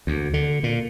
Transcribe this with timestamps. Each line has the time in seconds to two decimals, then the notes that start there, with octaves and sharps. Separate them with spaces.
0.07 D2
0.34 D3
0.63 A#2